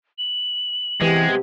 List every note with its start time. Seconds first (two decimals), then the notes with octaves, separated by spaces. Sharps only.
0.18 F#7
1.02 C3 E3 G#3 B3 G4